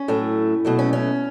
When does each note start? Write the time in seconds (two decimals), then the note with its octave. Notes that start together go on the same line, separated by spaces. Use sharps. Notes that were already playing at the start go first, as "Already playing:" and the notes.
Already playing: C#4
0.08 A2 F#3 A3
0.65 B2 F#3 A3
0.79 C#4
0.93 C#4